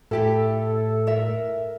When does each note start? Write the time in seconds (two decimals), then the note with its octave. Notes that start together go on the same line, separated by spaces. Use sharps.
0.11 A2 E4 G4 A4 E5
1.07 A#4 E5